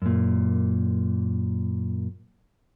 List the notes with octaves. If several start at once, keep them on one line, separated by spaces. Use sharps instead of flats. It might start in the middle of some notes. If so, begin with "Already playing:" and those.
F#2 A#2